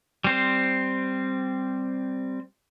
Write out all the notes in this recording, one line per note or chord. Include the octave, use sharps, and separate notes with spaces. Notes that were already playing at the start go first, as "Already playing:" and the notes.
G3 C4 C5